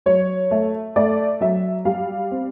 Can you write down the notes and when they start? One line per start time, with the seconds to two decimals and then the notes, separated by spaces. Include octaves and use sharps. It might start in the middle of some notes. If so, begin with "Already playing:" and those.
0.06 F#3 C#5
0.51 A3
0.96 A3 D5
1.41 F#3 E5
1.85 G3 F5
2.31 C4